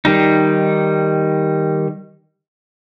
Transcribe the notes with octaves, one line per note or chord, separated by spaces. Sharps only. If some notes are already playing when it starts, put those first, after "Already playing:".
D#3 G3 D#4